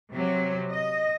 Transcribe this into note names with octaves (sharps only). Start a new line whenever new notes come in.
C3 F#3
D#5